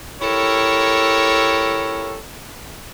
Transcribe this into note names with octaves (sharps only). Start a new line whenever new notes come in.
E4 G4 A4 A#4 C#5